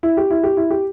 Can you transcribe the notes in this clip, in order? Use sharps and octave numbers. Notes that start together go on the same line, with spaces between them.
E4
G4
E4
G4
E4
G4